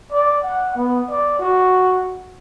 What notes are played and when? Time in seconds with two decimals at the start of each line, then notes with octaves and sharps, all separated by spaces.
0.12 D5
0.44 F#5
0.76 B3
1.10 D5
1.39 F#4